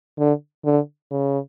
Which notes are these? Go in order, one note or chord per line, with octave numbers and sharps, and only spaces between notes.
D3
D3
C#3